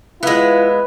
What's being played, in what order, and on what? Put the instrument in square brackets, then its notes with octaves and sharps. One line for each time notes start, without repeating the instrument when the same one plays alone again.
[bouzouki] G#3 B3 [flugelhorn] E4 [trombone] F4 [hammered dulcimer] B4